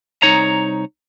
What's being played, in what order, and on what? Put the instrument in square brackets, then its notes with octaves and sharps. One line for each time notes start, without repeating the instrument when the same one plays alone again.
[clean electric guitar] C2 D#4 C#5 A#5